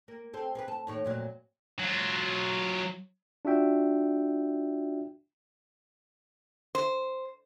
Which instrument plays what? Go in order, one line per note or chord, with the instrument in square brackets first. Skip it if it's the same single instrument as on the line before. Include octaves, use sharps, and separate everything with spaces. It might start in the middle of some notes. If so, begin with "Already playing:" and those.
[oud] A#3
C4 A4
G#4 A#4 B4
A4
D#2 A2 C#5
F2 A#2 F#3
[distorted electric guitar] F#3 F4
[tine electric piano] D4 F4 F#4 E5 G5
[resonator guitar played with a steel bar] C5